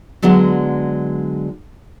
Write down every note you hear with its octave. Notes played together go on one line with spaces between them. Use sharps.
D3 F#3 G#3 B3 D4